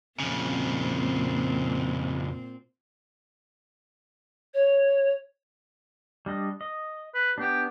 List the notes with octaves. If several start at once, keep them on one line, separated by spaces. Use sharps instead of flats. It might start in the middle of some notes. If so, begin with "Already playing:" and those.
F2 A#2 C#3 C4
C#5
G3 D4 D#5
D#5
B4
B3 D4 G4